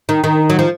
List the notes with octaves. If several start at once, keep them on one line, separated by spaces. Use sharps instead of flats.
D#3
D#3
F#3
F3